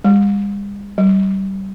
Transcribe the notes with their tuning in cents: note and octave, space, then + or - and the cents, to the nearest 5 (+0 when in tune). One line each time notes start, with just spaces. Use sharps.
G3 +45
G3 -25